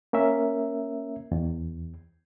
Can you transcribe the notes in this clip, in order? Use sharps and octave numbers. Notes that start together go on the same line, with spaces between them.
A#3 C#4 A#4 E5
E2